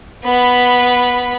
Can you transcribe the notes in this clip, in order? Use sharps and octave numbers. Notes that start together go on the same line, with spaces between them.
B3 B5